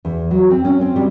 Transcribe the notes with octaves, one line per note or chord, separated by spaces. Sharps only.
E2
F#3
C4
C#4
C4
G3